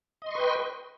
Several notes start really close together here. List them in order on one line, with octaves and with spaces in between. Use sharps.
D#5 C6 C#6 B4 G5